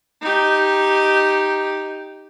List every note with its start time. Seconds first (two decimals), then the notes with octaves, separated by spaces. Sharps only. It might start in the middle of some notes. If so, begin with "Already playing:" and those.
0.21 D#4 G4